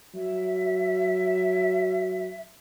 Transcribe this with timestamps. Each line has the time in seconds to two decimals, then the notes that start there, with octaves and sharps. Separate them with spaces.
0.15 F#3 E5